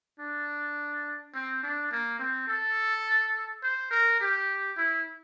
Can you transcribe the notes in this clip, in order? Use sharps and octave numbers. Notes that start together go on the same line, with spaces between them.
D4
C4
D4
A#3
C4
A4
C5
A#4
G4
E4